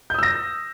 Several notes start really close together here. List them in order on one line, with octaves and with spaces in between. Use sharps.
G6 D#6 E6 A#6